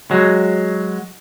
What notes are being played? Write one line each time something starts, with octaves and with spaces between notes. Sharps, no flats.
F#3 G#3